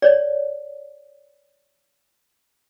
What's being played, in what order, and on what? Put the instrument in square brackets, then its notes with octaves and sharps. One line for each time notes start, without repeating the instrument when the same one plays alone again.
[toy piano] C#5 D5